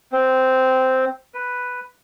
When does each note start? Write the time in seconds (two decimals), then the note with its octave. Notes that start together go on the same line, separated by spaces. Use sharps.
0.12 C4
1.34 B4